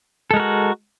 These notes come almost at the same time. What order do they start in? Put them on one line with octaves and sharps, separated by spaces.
A4 G#3 A#4 F#4